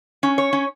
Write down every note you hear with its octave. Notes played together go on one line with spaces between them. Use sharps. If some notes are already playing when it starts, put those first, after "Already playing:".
C#4
C#5
C#4